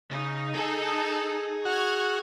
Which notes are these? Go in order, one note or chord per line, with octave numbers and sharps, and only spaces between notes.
C#3 D#4
G#4 A4 G#5
F#4 C#6 F6 G#6